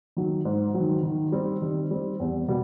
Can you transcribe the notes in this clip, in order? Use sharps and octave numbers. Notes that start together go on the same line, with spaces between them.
D#3 F#3
G#2
F#3
D#3
D#3
G3 C4
D#3
G3 C4
E2
B2 G3